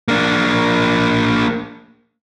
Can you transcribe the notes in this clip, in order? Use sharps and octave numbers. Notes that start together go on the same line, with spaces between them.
A#3 D4